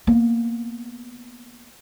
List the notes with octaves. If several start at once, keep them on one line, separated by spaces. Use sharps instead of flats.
A#3 B3